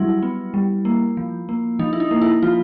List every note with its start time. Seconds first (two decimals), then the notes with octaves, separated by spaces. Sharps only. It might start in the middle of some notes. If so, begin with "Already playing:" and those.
Already playing: F#3 G3 E4
0.23 B3
0.54 G3
0.85 A#3
1.17 F3
1.49 A#3
1.79 F3 D#4
1.93 E4
2.00 D#4
2.11 A#3
2.22 E4
2.43 F3 F4